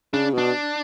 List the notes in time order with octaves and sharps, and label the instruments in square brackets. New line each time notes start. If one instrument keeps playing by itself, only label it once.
[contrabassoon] C#3 [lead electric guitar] D4
[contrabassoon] B2 [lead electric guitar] D4